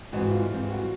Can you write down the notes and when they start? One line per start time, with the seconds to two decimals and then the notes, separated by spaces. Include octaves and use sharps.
0.12 G#2 E3 G3 C4 F#4
0.31 F4
0.51 G#2 E3 G3 C4
0.70 F#4